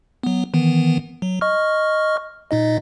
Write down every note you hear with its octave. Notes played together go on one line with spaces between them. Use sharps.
F#3 B3
D#3 E3 B3
F#3
D#5 C#6 F6
A#2 D#4 D#5